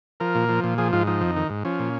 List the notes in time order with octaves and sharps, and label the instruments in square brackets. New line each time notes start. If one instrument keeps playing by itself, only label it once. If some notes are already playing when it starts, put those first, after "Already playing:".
[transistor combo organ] F3 A#4
A#2
F3
A#2
F3 G#4
G#2 F4
F3 D#4
F2
D#3
G#2
F3 C#4
A#2